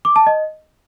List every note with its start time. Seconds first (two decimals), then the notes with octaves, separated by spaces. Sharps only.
0.05 D6
0.16 A5
0.27 D#5